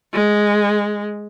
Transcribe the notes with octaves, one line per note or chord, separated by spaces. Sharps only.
G#3